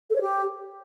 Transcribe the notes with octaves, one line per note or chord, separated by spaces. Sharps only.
A4
C#5
G4